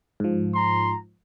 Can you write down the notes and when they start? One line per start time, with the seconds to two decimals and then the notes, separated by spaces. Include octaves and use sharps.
0.20 G#2 F3
0.55 A#5 C6